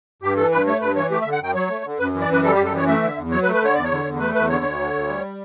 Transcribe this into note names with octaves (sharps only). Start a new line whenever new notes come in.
G2 G4
E3 A4
G2 B4
A3 C#5
G2 B4
E3 C#5
A3 G4
E5
D3
F#5
F#2 G5
F#3 C#5
A3
D3
F#2 B4
E3
D5
F#2 B4
G3 A4
G4
F#2
A4
E3 C#5
A3 E5
D3
E2
F#3 C#5
B4
A3
B4
D3 C#5
E2 D5
C#5
D3
E2
A3 B4
E2 B4
D3 C#5
D2
D3
D2
G3